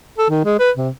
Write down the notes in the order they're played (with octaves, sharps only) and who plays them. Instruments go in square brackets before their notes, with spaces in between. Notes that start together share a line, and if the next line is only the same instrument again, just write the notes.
[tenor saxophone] A4
D#3
G#3
B4
C3